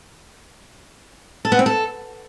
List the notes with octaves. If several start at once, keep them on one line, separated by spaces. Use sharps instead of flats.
A4
B3
C4
A4